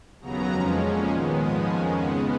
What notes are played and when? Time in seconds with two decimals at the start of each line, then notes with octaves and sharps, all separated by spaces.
0.20 D#2 C#3 F#3 B3 A#5
0.51 F2 F3 G#3 C#4
0.81 A#2 F3 G#3 C#4
1.11 D#2 D#3 G#3 B3
1.39 G#2 F3 G#3 B3 D#6
1.69 F2 D#3 G#3 C#4 G#5
2.00 C#3 G#3 B3 F#5